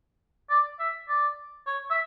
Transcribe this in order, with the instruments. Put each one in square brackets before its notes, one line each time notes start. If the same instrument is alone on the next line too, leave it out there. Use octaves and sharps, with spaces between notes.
[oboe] D5
E5
D5
C#5
E5